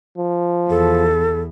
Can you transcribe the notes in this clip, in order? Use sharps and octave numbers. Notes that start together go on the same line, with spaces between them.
F3
E2 A4